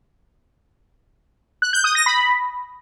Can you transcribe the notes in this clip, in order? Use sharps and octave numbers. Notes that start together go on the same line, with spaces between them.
F#6
G6
D#6
A#6
B5